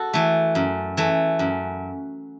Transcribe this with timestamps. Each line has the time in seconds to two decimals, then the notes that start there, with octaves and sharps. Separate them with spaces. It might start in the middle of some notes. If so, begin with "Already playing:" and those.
Already playing: F#4 A4
0.13 E3 A3
0.55 F#2
0.97 E3 A3
1.39 F#2